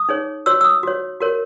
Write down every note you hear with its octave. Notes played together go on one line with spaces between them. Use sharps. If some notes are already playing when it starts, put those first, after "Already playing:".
Already playing: D#6
D#4 G#4 C#5
F#4 C#5 E6
E6
D#6
F#4 C#5
F#4 A#4 C#5